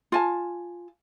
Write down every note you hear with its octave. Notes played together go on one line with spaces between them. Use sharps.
F4 G#5 A5